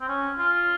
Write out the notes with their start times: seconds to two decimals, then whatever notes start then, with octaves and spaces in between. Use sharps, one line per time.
0.01 C4
0.08 C#4
0.39 F4